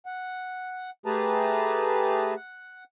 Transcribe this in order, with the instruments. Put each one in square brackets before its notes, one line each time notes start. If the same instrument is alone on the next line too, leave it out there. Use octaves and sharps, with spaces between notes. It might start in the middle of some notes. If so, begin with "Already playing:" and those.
[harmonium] F#5
A3 G4 G#4 B4 A5 A#5
F#5